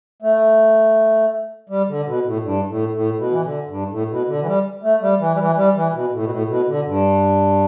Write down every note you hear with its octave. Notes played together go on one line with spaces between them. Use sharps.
A3
G3
D3
B2
A2
G2
A2
A2
B2
E3
D3
G2
A2
B2
D3
E3
G3
A3
G3
E3
G3
E3
G3
E3
B2
A2
B2
A2
B2
D3
G2